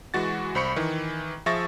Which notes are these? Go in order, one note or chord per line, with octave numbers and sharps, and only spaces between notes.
E3 G#3 F#4 A6
C2 C5 B5 C#6 C#7
D#3 E3
F3 G#4 E5 C#6 A6 A#6